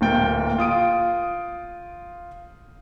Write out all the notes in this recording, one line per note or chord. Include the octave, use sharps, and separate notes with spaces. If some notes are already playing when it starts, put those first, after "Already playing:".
D1 A#2 G5
F4 D#6 D7